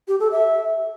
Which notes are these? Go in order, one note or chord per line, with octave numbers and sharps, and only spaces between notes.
G4
A4
E5